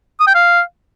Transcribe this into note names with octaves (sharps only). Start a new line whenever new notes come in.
D#6
G5
F5